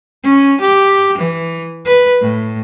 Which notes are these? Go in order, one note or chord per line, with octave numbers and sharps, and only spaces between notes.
C#4
G4
E3
B4
A2